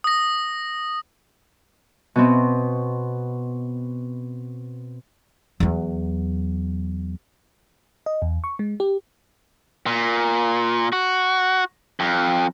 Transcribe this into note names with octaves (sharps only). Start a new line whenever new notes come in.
D#6 A#6
B2 B3 C4
E2 F#3
D#5
E2
C#6
G#3
G4
A#2
F#4
F2